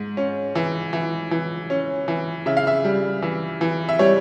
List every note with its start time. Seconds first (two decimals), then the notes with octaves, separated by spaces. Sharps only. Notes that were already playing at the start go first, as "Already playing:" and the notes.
Already playing: G#2
0.17 C#4
0.55 E3
0.93 E3
1.31 E3
1.70 C#4
2.08 E3
2.46 C#3 E5
2.57 F5
2.67 E5
2.85 G3
3.22 E3
3.61 E3
3.89 E5
3.99 G3 C#5